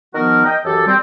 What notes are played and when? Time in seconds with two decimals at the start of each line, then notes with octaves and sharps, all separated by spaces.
0.14 D#3 F3 B3 F#4 A#4
0.45 D#5 G5
0.64 F#2 E3 G4 A4
0.86 G3 C4